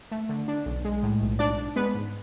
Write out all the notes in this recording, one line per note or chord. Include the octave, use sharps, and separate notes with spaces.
A3
D3
D4
B1
G#3
A2
B1
G#2 D4 D5
D4
G#3 B3 B4
G#2